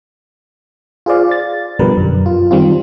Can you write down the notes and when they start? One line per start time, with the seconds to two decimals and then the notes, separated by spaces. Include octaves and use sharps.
1.06 F4 G#4 C5 D5 F5
1.31 A6
1.79 B2 D3 F3 G3 A#4 B4
1.97 F#2
2.26 F4
2.51 D#3 G3 C4 F4